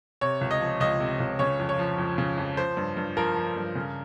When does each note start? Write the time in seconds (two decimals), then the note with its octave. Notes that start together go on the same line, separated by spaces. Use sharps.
0.21 C3 C#5
0.41 C#2
0.51 D#5
0.61 F3
0.80 C#2 D#5
1.00 C3
1.20 C#2
1.39 C#3 C#5
1.59 F2
1.69 C#5
1.79 F3
1.98 F2
2.18 C#3
2.38 F2
2.57 F3 C5
2.77 G2
2.97 G2
3.17 F3 A#4
3.36 F3
3.56 G2
3.75 C#3